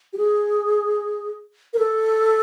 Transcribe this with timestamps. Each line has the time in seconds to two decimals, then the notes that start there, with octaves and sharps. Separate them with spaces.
0.13 G4
0.17 G#4
1.74 A#4
1.79 A4